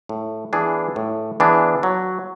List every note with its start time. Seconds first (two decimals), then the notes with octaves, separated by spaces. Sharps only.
0.09 A2
0.53 E3 B3 D4 G#4
0.96 A2
1.40 E3 B3 D4 G#4
1.83 F#3